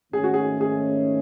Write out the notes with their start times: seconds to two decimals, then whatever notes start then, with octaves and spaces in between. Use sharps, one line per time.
0.13 G#2 D#3 A3 C#4 G#4
0.24 F#4
0.34 G#4
0.61 G#4